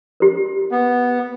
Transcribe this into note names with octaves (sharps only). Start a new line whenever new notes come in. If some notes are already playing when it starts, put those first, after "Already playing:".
G4 A#4
B3